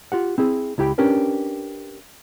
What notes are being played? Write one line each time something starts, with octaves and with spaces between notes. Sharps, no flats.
F4 G4 F#5
C4 E4 G#4
C#2 E4 G4 G5 B5
C#4 D4 G4 A#4 B4